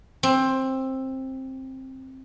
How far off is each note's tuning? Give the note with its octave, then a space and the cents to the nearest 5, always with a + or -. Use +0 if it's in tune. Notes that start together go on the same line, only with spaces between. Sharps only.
C4 +15